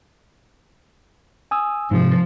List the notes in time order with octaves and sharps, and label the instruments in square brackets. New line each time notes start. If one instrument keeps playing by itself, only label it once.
[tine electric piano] G#5 D#6 E6
[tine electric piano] G#2 C3 [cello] F3